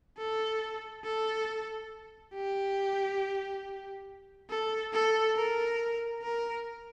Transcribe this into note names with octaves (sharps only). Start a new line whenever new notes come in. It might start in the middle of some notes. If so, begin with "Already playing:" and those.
A4
A4
G4
A4
A4
A#4
A#4